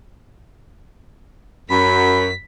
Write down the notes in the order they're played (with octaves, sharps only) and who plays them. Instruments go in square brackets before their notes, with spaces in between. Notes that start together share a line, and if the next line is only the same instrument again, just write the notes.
[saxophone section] F#2 [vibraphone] B5 [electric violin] B6